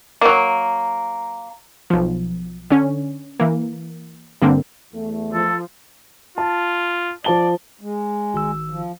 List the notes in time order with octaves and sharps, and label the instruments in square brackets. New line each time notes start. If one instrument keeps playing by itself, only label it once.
[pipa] F#3 A#3
[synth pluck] B1 F3
D3 C#4
E3 A#3
G2 D3 A#3 C4
[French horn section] E2 A3
[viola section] F3 [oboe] A4
[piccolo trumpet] F4 [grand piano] A5
[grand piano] F3 A5 G7 [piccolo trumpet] D5
[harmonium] G#3
[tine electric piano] G#1 D#3 E6
[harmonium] F3